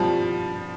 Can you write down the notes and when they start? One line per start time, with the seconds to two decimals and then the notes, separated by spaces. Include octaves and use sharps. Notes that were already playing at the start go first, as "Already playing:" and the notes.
Already playing: F3 G3